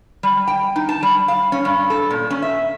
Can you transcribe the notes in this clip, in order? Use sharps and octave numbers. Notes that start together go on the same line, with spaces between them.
G3
G5
D#4
A5
G3
F5
C#4
G2
A4
A#2
C#4
E5